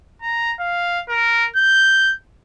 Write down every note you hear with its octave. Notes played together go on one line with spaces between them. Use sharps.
A#5
F5
A#4
G6